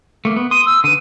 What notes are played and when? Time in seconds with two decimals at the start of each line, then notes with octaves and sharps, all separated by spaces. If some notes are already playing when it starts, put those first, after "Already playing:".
0.25 A3 A#3
0.36 B3
0.51 C6 D#6 D#7
0.66 E6
0.84 D3 B4 D#7